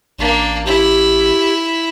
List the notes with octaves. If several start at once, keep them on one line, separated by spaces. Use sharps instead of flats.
A1 A#3 D4
E4 G4